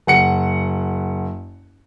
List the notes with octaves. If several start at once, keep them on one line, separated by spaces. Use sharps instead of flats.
F#1 F#5 C#7